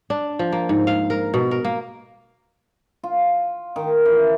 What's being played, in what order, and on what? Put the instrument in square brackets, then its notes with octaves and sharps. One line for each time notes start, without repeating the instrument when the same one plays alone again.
[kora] D4
F3
A#3
G#2
F5
A#4
B2
A#4
A#3
[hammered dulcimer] F4
D#3
E3